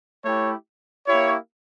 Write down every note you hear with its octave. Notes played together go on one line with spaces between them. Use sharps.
A3 E4 G4 C#5
A#3 E4 G4 C#5